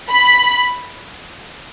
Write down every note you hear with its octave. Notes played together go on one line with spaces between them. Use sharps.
B5